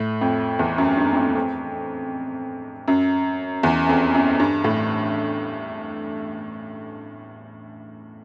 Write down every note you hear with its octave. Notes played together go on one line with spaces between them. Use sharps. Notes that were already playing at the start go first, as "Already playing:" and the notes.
Already playing: A2
F2
E2
F#2
G2
F2
F#2
F2
F#2
E2
F2
F#2
G2
A2